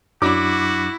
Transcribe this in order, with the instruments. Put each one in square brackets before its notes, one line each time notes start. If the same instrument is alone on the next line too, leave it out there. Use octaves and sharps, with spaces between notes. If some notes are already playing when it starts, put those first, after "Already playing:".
[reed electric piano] F#2 F#3 D4 [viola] E4 [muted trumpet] F#4 [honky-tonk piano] D6